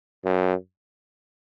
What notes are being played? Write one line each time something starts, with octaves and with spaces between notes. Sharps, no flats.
F#2